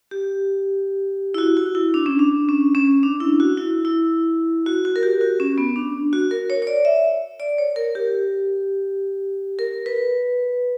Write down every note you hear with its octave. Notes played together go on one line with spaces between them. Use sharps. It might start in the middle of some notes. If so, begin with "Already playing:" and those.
G4
E4
F#4
F#4
E4
D4
C#4
D4
C#4
C#4
D4
E4
F#4
E4
E4
F#4
F#4
A#4
G4
F#4
C#4
B3
D4
F#4
A#4
C#5
C#5
D5
E5
D5
C#5
A#4
G4
A#4
B4